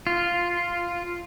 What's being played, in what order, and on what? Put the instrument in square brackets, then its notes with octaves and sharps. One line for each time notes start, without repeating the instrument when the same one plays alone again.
[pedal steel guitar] F4